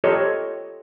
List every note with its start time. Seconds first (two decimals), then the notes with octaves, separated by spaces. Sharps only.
0.04 F4 G4 A4 C5 C#5 D#5